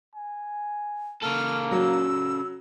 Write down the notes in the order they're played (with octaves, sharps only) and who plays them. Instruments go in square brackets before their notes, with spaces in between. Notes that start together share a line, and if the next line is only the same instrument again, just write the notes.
[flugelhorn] G#5
[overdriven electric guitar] C#3 A4 [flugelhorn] A#3 [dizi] F6
[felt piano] F#3 [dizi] E6